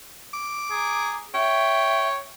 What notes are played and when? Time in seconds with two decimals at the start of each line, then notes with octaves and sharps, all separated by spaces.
0.34 D6
0.70 G#4 A#5
1.35 C#5 E5 G5